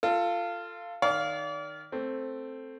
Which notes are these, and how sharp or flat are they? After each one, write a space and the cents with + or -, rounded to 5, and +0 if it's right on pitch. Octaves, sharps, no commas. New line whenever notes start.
F4 -10 A4 +20
D#3 -10 D5 -35 F5 +0
A3 +5 C4 +5